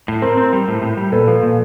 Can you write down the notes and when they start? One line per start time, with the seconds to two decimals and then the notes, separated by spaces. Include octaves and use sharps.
0.08 A2
0.22 C4 A#4 C5
0.37 C4
0.53 G3
0.68 A2
0.82 A2
0.97 G3
1.12 A#2 A4 B4
1.28 F3
1.43 A#2